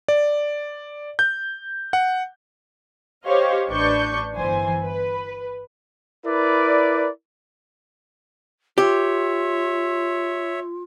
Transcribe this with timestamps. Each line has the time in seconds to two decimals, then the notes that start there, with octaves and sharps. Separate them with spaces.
0.08 D5
1.19 G6
1.93 F#5
3.25 G4 C5 C#5 D#5 F5
3.68 A1 D4 B4 C#6 G6
4.34 G1 E3 C5 G#5
4.83 B4
6.26 E4 A#4 B4 D5
8.78 F4 G4 C#5 E5